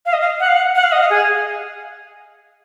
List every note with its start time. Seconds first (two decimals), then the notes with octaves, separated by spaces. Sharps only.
0.06 F5
0.13 D#5
0.21 F5
0.40 F#5
0.48 F5
0.56 F#5
0.75 F#5
0.83 F5
0.92 D#5
1.01 F5
1.10 G#4